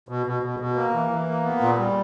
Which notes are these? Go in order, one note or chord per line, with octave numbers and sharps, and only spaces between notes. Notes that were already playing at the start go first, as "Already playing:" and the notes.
B2
B2
B2
B2
A#3
E3
E3
A#3
B3
A#2
G3